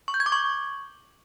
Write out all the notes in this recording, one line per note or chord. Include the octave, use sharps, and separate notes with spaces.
C#6
G6
G#6
D6
C#6